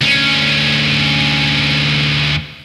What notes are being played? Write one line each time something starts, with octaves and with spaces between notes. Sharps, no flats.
D2 C#4